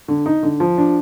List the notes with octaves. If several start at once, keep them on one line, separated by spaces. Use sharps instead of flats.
D3
D#4
D3
F3
D4